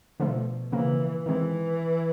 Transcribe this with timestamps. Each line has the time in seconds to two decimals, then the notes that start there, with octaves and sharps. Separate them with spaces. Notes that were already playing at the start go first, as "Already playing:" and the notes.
0.20 B2 D3 F3 A3
0.72 C#3 E3 F3 A#3
1.26 D#3 E3 G#3 C4